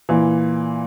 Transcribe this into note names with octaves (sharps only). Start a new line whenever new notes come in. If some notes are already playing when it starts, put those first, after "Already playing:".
A#2 E3